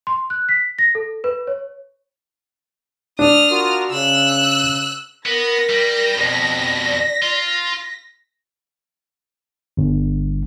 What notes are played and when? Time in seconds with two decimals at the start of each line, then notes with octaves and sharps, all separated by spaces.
0.07 C6
0.30 F#6
0.49 B6
0.79 A#6
0.95 A4
1.24 B4
1.47 C#5
3.19 D4 D#6 F6
3.51 F4 F#4 A#4
3.91 C#3 E6 F#6
5.26 B3 A#4 A#6 B6
5.70 G3
6.18 F2 B2 D5
7.23 F4
9.77 G1